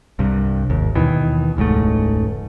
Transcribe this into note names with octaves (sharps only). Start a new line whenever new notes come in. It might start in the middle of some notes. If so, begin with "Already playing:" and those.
C2 G2 C3
G#1 D#2
D#2 B2 D#3 E3
E1 C#2 G#2 A3